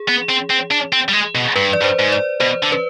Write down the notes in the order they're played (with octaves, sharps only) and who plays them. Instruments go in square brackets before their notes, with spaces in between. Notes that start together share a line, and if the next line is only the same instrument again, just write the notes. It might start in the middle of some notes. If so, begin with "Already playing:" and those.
Already playing: [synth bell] G#4
[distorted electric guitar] B3
C4
C4
D4
C4
G3
G#3
B2
[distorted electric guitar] G2 [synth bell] B4
[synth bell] D5
[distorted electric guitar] G2
[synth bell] C5
[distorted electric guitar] G#2
[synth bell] D5
[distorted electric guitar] B2 [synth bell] C5
[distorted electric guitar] D3
[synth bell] B4